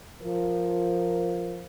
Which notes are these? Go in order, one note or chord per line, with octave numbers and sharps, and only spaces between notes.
F3 A#4